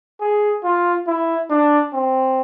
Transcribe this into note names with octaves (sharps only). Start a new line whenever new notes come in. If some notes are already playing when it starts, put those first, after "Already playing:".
G#4
F4
E4
D4
C4